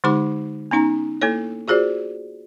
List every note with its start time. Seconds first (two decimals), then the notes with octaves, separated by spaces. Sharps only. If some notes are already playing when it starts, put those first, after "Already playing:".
0.04 D3 G#3 D#4 G4 B5 D6
0.71 B3 C#4 D#4 A#5
1.22 A#3 E4 A4 C#5
1.68 F4 F#4 G#4 C5 D5